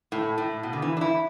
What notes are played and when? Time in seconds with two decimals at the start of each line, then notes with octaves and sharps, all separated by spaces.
0.12 A2
0.38 A2
0.63 B2
0.73 D3
0.82 E3
0.97 D4
1.01 E4